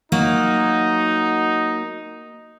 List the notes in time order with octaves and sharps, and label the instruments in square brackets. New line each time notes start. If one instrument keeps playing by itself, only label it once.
[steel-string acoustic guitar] F#3 A#3 F#4 [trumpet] D#4